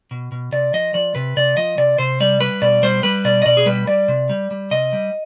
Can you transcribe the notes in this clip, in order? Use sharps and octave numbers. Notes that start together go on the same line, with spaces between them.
B2
B2
C3 D5
F3 D#5
F3 D5
C3 B4
C3 D5
F3 D#5
C3 D5
C3 C5
G3 D5
G3 B4
B2 D5
G3 C5
G3 B4
B2 D5
D#5
B2 D5
G#4
G3 B4
G3 D5
C3
G3
G3
C3 D#5
G3